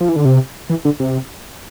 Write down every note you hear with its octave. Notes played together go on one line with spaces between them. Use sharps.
F3
E3
D3
C3
E3
D3
C3